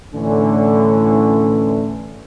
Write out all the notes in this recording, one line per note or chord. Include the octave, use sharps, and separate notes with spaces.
A2 D3 E3 C#4